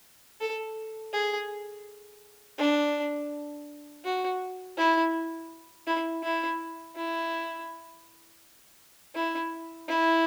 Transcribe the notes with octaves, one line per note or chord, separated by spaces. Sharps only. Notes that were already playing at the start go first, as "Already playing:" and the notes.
A4
G#4
D4
F#4
E4
E4
E4
E4
E4
E4